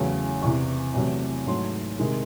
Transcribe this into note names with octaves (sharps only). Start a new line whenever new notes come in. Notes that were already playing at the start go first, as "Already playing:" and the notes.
Already playing: E2 C#3 F#3 A3
E2 C3 E3 C#6
E2 C3 F#3 A3
G#2 F#3 A3 C6
C3 D#3 G#3